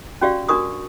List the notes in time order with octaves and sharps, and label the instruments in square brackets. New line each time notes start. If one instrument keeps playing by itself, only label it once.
[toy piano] C#4 F#4 G4 D5 F5
D4 F#4 A#4 C#6 D#6